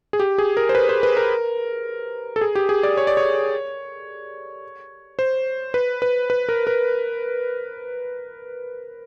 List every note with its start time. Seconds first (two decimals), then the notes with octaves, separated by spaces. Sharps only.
0.13 G#4
0.20 G4
0.38 G#4
0.57 A#4
0.69 C5
0.75 B4
0.89 C5
1.03 B4
1.17 A#4
2.36 A4
2.41 G#4
2.55 G4
2.69 G#4
2.83 D5
2.97 C#5
3.07 D5
3.17 C#5
5.19 C5
5.74 B4
6.02 B4
6.30 B4
6.49 A#4
6.67 A#4